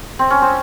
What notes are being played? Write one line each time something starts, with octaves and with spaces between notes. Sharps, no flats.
C4
C#4
C4